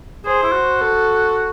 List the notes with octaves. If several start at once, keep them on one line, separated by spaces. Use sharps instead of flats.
G#4 C5
E4
F#4
A4